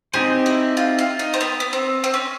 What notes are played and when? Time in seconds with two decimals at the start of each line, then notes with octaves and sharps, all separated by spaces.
0.14 C4 D#4 G4 G#4 C5
0.46 E4
0.77 F4
0.99 F4
1.19 D#4
1.34 C4
1.41 B3
1.60 B3
1.73 C4
2.04 C4
2.14 C#4